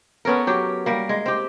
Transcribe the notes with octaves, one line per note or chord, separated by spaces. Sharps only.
B3 C#4 A4 A#4
F#3 G4
G3 A#3
G#3
C4 G4